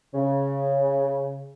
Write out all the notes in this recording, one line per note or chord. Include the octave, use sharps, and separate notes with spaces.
C#3